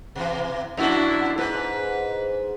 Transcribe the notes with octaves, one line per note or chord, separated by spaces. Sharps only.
B2 E3
F2 D4 E4 F#4
G#2 B4